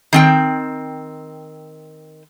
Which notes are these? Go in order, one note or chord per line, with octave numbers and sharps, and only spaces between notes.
D#3 C4 G5